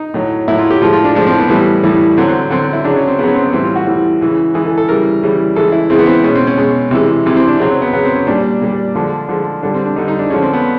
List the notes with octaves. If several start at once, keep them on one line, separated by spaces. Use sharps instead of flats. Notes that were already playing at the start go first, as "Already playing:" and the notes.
Already playing: D#4
A2 F#3
A2 F#3 E4
F4
G4
A2 F3 G#3 F4
F4
D4
A2 F3 G#3 D4
C4
B3
A2 E3 G3
A2 E3 G3
D3 F#3 C4
C4
D3 F#3 C4
E4
C#3 F#3 D4
C#4
C4
C#3 F#3 B3 C#4
C4
B3
A2 E3 G3 C4
F4
F#4
A2 E3 G3
C#3 E3 G#3
C#3 E3 G#3 G#4
A4
A4
C#3 E3 G3 A#4
C#3 E3 G3
C#3 E3 G#3 A4
E4
C#3 E3 G#3 C4
B3
C4
B2 G#3 C#4
C4
C#4
B2 G#3
C3 E3 G#3
C3 E3 G#3
C4
D4
C#3 F#3 C4
C4
B3
C#3 F#3 B3
C4
C#4
A#2 G3 D4
A#2 G3
D3 F3 G#3 D4
D3 F3 G#3
D3 G3 D4
C4
D4
D3 G3 D#4
D#4
D4
D3 F3 G#3 C#4
C4
B3